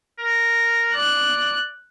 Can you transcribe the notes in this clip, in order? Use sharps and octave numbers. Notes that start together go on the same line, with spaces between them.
A#4
D5 F#6